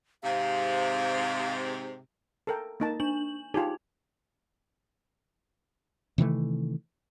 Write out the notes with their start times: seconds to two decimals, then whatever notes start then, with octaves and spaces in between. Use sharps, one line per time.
0.24 G#2 C3 F5
2.47 A4 A#4 G5
2.80 A#3 D#4 A5
3.00 D4 F#7
3.54 D#4 F4 G4 G#4
6.18 C3 D#3 E3 A3